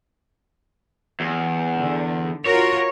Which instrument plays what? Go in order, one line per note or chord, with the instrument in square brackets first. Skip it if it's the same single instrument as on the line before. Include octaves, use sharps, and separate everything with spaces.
[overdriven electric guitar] E2
[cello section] D3
[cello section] F4 F#4 A#4 [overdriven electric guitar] C#5